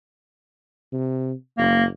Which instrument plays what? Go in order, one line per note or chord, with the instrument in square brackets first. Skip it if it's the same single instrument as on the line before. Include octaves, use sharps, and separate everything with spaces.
[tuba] C3
[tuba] F#1 [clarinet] A#3